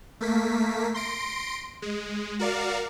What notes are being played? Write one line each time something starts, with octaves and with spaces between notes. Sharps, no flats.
A3 A#3 B6
C6 A#6 D7
G#3
F#4 A#4 D5 F5